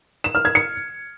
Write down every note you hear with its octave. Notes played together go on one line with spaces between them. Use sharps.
E7
F6
G#6
C#7